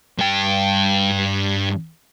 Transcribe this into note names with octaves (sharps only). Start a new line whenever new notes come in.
G2 G5